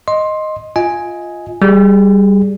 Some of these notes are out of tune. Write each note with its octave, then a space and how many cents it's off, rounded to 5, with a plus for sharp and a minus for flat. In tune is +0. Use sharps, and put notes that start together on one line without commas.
D#5 +0 C6 +15
F4 +0 D#5 +20 G#5 +0
G3 +0 G#4 +0